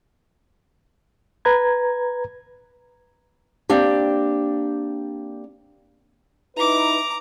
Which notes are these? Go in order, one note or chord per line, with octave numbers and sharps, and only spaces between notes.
B4 A#5 G#6
A#3 C4 D4 G4
D#4 E4 B4 A#5 D6